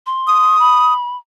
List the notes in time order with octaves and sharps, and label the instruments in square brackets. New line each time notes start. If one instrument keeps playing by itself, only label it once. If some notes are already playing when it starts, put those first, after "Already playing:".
[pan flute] C6
[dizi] D#6
[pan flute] B5